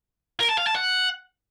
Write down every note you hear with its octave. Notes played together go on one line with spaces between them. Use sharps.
A#4
A5
F5
A5
F#5